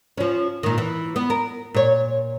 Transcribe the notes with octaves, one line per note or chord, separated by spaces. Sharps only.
F3 C#4
A#2 D#3
E3
B3
A#4
A#2 C#5